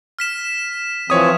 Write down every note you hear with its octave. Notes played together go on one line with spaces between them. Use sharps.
F6 B6 E7
E3 F3 C4 C#5 D#6